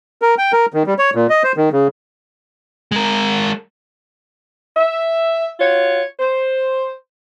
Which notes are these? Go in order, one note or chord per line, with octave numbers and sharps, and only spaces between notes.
A#4
G5
A#4
D#3
G3
C#5
A#2
D#5
C5
D#3
C#3
G#3 A#4
E5
F4 F#4 C#5
C5